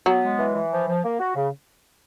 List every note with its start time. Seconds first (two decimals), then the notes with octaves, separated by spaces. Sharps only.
0.06 F#3 B3
0.23 G#3
0.39 E3
0.55 E3
0.71 F3
0.88 F3
1.04 A#3
1.20 F#4
1.36 C#3